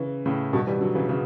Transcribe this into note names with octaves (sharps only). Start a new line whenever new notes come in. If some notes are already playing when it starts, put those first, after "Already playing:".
Already playing: C#3 E3
A2 C#3
G2 B2
E3 G3
D3 F#3
C#3 E3
C#3 E3